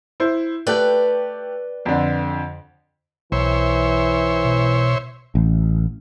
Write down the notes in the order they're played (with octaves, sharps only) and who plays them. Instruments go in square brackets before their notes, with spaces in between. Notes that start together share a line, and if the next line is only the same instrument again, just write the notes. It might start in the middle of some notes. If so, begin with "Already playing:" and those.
[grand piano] E4 C5
[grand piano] A3 G4 F#6 [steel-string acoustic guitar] B4 D5 G5
[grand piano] F2 D3
[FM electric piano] B1 [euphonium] E3 [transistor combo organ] C5 C#5 E5
[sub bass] B2
[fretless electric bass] A1